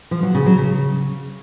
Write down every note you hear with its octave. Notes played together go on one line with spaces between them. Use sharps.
F3
F#3
C#3
F#3
C#3